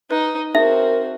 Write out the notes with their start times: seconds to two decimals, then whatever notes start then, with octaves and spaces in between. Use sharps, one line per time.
0.11 D#4 B4 D#5
0.55 C4 D#4 F#4 G#4 A#4 E5